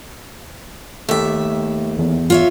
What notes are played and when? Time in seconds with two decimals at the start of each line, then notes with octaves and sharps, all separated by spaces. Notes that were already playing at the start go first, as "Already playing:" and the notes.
1.09 D#2 A3 G4 E5
1.99 E2
2.30 F4 C#5 E5